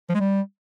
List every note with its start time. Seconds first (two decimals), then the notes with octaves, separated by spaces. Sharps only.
0.10 F3
0.15 G#3
0.20 G3